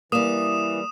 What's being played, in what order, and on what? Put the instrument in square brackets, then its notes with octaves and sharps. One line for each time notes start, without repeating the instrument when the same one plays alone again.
[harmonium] E3 [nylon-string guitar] G3 A#3 [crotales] D#6 E7